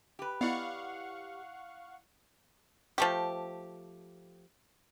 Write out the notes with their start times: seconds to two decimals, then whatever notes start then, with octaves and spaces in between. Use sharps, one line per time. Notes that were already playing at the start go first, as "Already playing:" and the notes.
0.19 G4 B4
0.41 B3 E4 D5 D#5 F5 F#5 C#6
2.98 F3 A3 G4